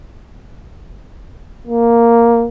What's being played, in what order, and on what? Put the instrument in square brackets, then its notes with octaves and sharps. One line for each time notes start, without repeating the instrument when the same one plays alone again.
[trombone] A#3